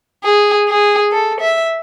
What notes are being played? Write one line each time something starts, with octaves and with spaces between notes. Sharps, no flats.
G#4
G#4
A4
E5